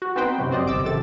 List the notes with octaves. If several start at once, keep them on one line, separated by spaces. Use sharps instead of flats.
F#4
B3 C4 D#4 B4 C5 G5
F#2 C3 F#3
C4 C5 D5 D#5
G1 C2 D6 E6
G#1 F#2 C3 A4 A6